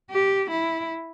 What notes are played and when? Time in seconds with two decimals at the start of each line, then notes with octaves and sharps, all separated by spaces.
0.11 G4
0.50 E4